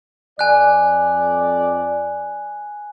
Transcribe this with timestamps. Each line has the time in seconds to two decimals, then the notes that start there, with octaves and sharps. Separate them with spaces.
0.39 F2 D5 G#5 F#6